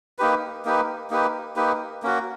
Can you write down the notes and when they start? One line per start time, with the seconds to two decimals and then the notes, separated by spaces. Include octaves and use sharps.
0.19 A#3 D#4 G4 B4
0.65 A#3 D#4 G4 B4
1.11 A#3 D#4 G4 B4
1.56 A#3 D#4 G4 B4
2.03 A#3 C#4 F#4